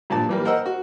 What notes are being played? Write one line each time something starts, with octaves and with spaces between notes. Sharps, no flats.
G2 A#2 F3 A5
E3 G3 A#3
A#4 C5 D#5 F#5 E6
F#4